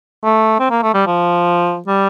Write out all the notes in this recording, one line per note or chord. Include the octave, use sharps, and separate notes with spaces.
A3
C4
A#3
A3
G3
F3
G3